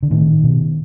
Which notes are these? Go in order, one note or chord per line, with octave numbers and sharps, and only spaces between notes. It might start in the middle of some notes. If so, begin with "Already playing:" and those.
D3
A2 D#3
B2